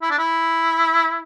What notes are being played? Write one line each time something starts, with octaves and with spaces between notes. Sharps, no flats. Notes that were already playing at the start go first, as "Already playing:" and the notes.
E4
D4
E4